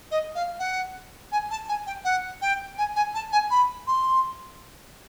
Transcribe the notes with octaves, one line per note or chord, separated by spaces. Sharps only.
D#5
F5
F#5
G#5
A5
G#5
G5
F#5
G5
G#5
G#5
A5
G#5
B5
C6